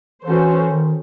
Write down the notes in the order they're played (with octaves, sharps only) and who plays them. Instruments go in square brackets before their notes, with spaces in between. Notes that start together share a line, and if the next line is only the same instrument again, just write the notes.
[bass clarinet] E3 [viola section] C#4 F#4 A4 C5
[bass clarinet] D#3